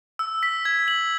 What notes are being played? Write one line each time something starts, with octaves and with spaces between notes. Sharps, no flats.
E6
B6
G#6
F#7